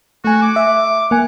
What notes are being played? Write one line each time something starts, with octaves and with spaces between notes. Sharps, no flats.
A3 F#4 G#5
D6
E5
A#3 F#5 G#5